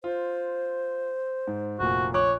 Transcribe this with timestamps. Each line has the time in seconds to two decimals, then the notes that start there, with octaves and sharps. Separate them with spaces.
0.04 F4 C5
1.47 G#2
1.79 F1 A#2 F#4
2.14 A#1 C#5 D6 F#6